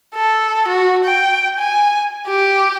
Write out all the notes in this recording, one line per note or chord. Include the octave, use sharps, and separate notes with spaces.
A4
F#4
G5
G#5
G4